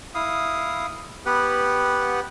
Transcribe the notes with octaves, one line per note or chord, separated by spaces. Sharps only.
E4 F5 D#6
B3 G4 B4 F#5